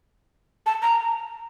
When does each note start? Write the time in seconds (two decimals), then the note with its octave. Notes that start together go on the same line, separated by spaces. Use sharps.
0.66 A5
0.82 A#5